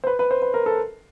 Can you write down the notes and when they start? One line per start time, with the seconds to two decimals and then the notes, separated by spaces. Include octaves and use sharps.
0.04 C5
0.07 B4
0.19 B4
0.31 C5
0.42 B4
0.54 A#4
0.66 A4